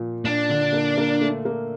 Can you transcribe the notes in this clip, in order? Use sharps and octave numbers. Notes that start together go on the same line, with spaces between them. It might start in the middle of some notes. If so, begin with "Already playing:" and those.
Already playing: A#2 F3
A#2 D4
D3
A#3
A#3
A3
A#3